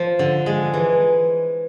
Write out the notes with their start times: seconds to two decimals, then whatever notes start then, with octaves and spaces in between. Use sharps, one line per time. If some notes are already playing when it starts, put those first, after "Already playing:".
Already playing: F3
0.19 D3
0.46 G#3
0.74 E3